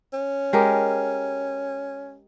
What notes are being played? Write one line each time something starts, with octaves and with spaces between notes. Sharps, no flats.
C#4
G#3 G4 A#4